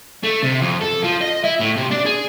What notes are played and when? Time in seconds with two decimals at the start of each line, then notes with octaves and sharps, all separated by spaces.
0.23 A3
0.43 C3
0.62 F2
0.81 A4
1.04 F3
1.21 D#5
1.44 E4
1.60 A2
1.77 C3
1.91 D4
2.06 G#4